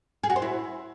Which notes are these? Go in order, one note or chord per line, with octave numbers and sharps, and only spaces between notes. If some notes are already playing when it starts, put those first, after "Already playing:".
G#4
F#4
C5
E4